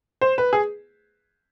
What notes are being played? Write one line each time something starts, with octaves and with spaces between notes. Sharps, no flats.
C5
B4
G#4